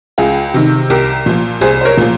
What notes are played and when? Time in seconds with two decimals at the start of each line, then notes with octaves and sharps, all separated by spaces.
0.18 C#2 F4 G#4
0.54 C3 D#3
0.90 C2 G4 A#4
1.26 A#2 F3
1.61 C2 G#4 C5
1.81 C5
1.85 A#4 C#5
1.97 A#2 F3